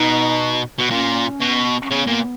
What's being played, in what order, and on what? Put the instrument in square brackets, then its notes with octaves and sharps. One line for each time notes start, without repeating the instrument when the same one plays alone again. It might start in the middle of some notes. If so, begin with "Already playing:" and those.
Already playing: [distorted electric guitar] B2 [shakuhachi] D#4
[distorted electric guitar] B2
[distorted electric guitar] A#2 [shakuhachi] C#4
[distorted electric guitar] B2
[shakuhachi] C#4
[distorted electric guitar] C#3 [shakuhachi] B3
[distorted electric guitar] A#2